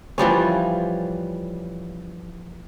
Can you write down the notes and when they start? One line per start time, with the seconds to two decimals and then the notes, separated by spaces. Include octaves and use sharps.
0.18 E3 F3 G3 C#4